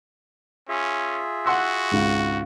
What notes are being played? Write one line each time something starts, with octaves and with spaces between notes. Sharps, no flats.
C#4 F4 G#4 E5
F#4 F#5 C6 E6
G#1 C#2 G#2